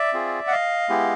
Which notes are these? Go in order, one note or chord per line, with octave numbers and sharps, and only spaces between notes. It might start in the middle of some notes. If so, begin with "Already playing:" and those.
Already playing: D5 E5
C4 F4 G#4
F#5
D#5 F5
G#3 B3 E4 G4